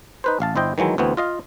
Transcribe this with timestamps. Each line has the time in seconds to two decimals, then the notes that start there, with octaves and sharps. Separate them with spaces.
0.24 D#4 B4 C5
0.40 A1 F5 A5
0.56 G1 E4 C5 D#5 G5
0.78 D#3 E3 F#3 G#3 E4
0.98 D2 E3 B3 C4
1.17 F4 D#5 F5